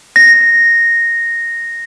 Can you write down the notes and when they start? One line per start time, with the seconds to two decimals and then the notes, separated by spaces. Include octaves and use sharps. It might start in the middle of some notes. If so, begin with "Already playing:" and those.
0.16 A#6